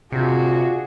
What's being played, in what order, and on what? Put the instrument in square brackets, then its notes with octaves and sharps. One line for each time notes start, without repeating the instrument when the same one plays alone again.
[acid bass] C3 [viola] D4 G#4 [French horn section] F4 [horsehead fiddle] F#4